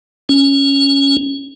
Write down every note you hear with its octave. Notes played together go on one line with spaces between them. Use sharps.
C#4